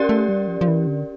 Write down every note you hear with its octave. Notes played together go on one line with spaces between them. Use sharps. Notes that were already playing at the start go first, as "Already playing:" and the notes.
Already playing: C#4 G4 A#4 D5
A3
G3
F3
F3
E3
D3